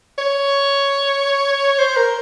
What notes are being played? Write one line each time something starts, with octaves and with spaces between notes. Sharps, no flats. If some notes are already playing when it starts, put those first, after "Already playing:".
C#5
C5
A#4